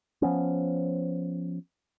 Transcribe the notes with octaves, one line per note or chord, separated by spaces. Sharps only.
F3 B3 C#4